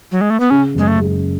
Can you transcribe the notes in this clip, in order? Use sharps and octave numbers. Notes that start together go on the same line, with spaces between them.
F#3
G#3
A3
B3
C#3 C#4
F#1 G#3
A3
G#3